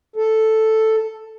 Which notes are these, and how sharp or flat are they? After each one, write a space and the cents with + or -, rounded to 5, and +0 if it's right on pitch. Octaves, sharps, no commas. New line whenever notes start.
A4 +0